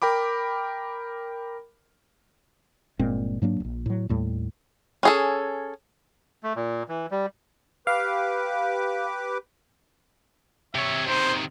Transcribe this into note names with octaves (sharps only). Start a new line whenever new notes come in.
A#4 G5 B5 D6
G1 A#2 G#3 C4
G#2 F#3 A#3 D4
D1 A#1
A2 F#3
D#2 A2 G3
C#4 G#4 A4
A3
A#2
E3
G3
G4 B4 F5 D6
C3 C#5 E5
C3 D#3 C5